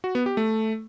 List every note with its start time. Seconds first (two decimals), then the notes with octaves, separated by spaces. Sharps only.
0.04 F#4
0.15 B3
0.26 G4
0.37 A3